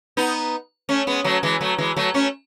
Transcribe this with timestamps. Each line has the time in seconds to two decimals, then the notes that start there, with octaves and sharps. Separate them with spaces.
0.17 B3 D#4
0.89 A3 C#4
1.07 G#3 B3
1.24 F#3 A3
1.43 E3 G#3
1.61 F#3 A3
1.78 E3 G#3
1.96 F#3 A3
2.14 A3 C#4